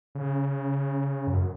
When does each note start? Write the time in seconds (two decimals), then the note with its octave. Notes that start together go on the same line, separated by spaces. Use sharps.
0.15 C#3
1.27 F#2